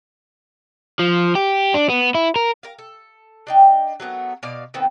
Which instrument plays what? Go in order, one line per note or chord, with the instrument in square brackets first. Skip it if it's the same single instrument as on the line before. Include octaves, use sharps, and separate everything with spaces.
[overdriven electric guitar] F3
G4
D4
B3
E4
A#4
[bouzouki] A#4 F5
A4
D4 D#4 G5
F#3 A3 B3 A#4
B2 D5 F5
D#3 A3 B3 C4